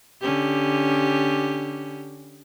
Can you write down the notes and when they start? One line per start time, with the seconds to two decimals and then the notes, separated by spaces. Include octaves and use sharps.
0.21 D3 C#4 G4